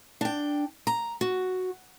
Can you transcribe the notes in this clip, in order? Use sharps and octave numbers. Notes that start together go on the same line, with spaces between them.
D4 G5
A#5
F#4